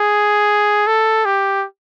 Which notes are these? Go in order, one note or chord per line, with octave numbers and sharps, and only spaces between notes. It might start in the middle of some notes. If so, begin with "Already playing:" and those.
Already playing: G#4
A4
G4